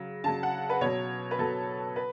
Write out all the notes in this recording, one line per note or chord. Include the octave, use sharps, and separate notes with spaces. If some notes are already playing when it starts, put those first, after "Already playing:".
Already playing: C#3 F#3
C#3 F#3 A5
F#5
B4
B2 F#3 C#5
B4
B2 F#3 A4
B4